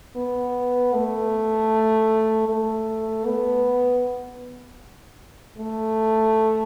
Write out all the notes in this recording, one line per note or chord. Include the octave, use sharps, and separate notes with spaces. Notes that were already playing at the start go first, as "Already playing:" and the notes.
B3
A3
A3
B3
A3